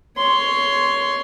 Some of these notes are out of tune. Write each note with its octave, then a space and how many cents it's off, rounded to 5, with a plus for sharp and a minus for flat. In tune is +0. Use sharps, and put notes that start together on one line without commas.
C#5 +10 C6 +0